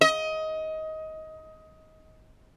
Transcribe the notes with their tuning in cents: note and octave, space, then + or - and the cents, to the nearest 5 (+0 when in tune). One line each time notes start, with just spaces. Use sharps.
D#5 +20